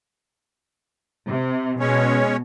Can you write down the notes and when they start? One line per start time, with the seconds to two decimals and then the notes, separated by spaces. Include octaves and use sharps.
1.29 C3
1.80 B2 G#3 C#4 C#5